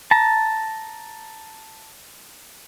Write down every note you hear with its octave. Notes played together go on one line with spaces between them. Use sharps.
A5 A#5